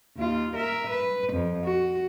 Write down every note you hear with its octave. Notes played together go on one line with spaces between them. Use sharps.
D#2 F4
A#4 E5
B4
F2
F#4